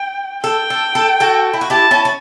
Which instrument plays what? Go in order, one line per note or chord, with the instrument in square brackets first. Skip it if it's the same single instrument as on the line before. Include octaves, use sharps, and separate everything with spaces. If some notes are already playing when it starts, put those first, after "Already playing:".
Already playing: [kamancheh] G5
[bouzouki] A4 [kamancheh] G5
[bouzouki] A4
A4
F#4 A4
E4
F#4
[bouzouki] E4 G4 [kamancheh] A5
[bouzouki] C#4 E4
C#4